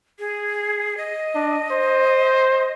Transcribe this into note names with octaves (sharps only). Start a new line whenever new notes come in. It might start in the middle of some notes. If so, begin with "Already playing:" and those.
G#4
D#5
D4
C5